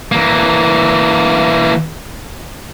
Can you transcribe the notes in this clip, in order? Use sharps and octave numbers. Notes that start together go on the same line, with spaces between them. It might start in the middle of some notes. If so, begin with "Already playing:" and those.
E3 A#3